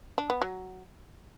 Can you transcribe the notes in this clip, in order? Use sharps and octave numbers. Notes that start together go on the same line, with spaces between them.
D4
B3
F#3